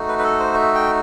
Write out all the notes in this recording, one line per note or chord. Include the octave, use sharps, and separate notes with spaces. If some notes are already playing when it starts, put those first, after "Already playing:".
Already playing: A3 D#4 F#4
B4
B4
A4
C5
E5
G5